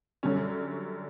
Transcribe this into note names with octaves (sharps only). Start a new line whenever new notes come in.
F#2 D3 G3 C#4